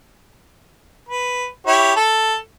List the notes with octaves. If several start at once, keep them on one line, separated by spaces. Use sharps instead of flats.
B4
E4 G4 C#5
A4